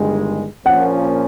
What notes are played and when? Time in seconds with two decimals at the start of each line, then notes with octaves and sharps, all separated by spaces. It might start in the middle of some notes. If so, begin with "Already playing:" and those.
Already playing: G1 G2 D#3 G#3
0.65 A#1 A#2 F3 A#3 C#4 F#5